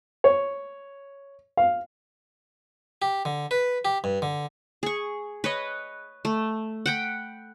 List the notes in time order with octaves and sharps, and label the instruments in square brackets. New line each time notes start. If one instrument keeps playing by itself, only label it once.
[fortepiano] C#5
F5
[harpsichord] G4
D3
B4
G4
G2
D3
[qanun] G#4 C#6
B4 C#5 D#5
A3
F#5 G5 B5